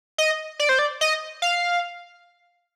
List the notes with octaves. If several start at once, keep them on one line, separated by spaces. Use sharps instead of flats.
D#5
D5
C5
D5
D#5
F5